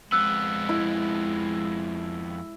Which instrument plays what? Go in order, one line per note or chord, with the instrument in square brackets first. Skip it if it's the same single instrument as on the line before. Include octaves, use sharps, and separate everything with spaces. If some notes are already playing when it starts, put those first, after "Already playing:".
[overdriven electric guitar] F2 B3 [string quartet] G#3 [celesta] E6 F#6
[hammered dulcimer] E4